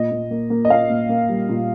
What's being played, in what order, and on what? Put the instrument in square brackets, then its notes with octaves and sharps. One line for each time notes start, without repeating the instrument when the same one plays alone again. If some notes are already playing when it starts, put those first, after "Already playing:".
Already playing: [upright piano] A#2 D#5
A#2
A#3
A#3
D#5
A#2 F5
A#2
A#3
G3
A#2